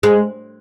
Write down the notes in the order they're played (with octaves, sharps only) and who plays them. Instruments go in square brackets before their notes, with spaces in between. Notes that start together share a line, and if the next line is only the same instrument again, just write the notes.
[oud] G#3